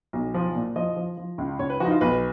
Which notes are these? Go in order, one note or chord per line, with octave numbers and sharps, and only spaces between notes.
B1
F3
A#2
F3 D#5
F3
F3
C#2
C#2 C#5
B4
F3 D#4 F#4
F4
B1 B4